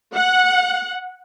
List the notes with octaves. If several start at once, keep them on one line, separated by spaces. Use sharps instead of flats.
F#5